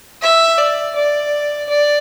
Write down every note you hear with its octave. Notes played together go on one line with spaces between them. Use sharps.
E5
D5
D5
D5